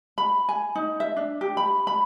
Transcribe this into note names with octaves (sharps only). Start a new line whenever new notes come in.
B5
G#5
D#4
E5
D4
G4
B5
B5